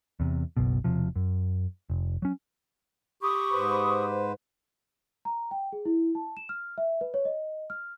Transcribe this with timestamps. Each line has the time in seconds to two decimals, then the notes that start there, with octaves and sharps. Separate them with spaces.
0.20 E2 C3
0.57 F#1 B1 B2
0.84 E1 C3 F3
1.16 F#2
1.90 F1
2.22 F#3 C#4
3.23 G4 B5 C#6 D#6
3.52 G#2 B4 C5
5.25 A#5
5.51 G5
5.73 G#4
5.85 E4
6.15 A5
6.37 E7
6.49 F6
6.78 E5
7.01 B4
7.14 C#5
7.25 D#5
7.70 F6